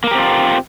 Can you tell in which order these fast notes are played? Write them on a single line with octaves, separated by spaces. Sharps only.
A#3 A#4 G4 C4 F4